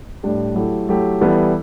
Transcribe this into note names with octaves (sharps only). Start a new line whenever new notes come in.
A2 G3 D4 G4
F#3 A3 E4 G4
F#3 A3 E4 G4
E3 G3 B3 E4 A4